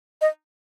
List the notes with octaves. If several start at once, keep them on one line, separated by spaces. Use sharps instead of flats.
D#5